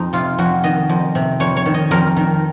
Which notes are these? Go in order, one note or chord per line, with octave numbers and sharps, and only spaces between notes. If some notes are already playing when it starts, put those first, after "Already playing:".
Already playing: F2 D#4
C3 F4
F2 F#4
D#3 D#5
F2
C3
F2 C#5
C#5
D#3
D#5
F2 A#4
D#3